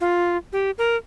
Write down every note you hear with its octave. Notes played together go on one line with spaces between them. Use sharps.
F4
G4
A#4